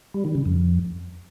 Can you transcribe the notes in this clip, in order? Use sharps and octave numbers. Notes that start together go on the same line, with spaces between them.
G3
D#3
C#3
F2